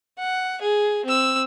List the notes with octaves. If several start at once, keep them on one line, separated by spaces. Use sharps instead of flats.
F#5
G#4
C4 E6